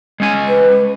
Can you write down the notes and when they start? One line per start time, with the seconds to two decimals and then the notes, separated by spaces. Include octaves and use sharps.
0.20 G#3 C#4 G#5
0.48 B4